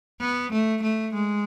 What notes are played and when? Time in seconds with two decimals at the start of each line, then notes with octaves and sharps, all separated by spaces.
0.21 B3
0.52 A3
0.82 A3
1.14 G#3